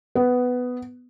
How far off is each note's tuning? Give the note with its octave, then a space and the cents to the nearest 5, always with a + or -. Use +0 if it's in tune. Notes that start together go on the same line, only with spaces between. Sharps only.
B3 +10